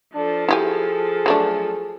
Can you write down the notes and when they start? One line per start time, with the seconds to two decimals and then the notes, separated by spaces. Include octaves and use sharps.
0.15 F3 D4 A4
0.49 E4 G4 G#4 G#5
1.26 F#3 A3 D4